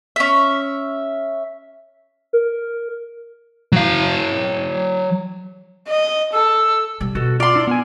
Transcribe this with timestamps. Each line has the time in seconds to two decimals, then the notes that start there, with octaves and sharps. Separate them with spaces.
0.16 C#4 E5
2.33 A#4
3.72 F#3 F5
5.88 D#5
6.33 A4 E6
7.00 C3 G3
7.15 B2 F#4 A4
7.40 F4 D5 C6
7.55 D4 E4
7.67 B3 A#4 G#5